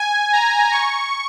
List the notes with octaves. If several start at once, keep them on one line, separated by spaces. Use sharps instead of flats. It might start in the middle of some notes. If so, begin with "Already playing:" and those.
Already playing: G#5
A#5
C#6